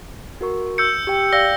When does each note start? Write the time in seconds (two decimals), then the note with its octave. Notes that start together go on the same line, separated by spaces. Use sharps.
0.41 F#4 A#4 C#6
0.78 E6 G6 C#7
1.07 G4 G5
1.33 D5 F5 G5 E6 A#6 G7